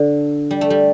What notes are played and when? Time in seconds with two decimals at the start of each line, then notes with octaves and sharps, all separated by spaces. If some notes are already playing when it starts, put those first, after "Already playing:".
Already playing: D3
0.51 G3
0.61 A3
0.70 G3